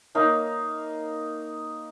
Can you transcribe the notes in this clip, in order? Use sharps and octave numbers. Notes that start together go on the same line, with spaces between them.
A#3 D#4 C#5 F5